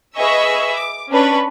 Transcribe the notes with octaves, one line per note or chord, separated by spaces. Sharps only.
G#4 B4 D#5 E5 C#6 E6
D6
C#4 D4 B4 B5 C#6